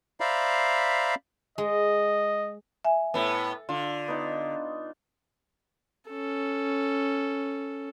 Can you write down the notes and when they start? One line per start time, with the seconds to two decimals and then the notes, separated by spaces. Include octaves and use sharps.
0.20 C5 D5 E5 F5 A#5 B5
1.58 G#3 D#5
2.85 E5 G#5
3.14 A2 B3 A4
3.69 D3 F4
4.08 B3 D#4
6.10 C#4 A4